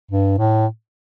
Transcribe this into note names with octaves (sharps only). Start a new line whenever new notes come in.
G2
A2